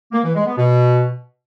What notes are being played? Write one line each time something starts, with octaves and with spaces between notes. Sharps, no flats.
A#3
E3
G#3
B3
B2